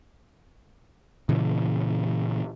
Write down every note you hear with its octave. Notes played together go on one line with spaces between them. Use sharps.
A#2 C#3 E3